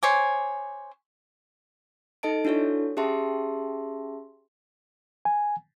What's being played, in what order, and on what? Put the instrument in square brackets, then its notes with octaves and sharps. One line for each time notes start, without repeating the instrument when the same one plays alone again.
[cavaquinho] C5 C#5 G#5 D6
[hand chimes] D#4 A4 D#5 A5 D7
D4 E4 F#4 A4 C#5
C#4 G4 G#4 E5 A5 C6
[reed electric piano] G#5